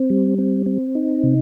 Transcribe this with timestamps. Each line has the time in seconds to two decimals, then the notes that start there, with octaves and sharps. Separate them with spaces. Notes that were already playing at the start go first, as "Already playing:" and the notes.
Already playing: C4
0.10 G3
0.38 C4
0.66 C4
0.95 D#4
1.23 C3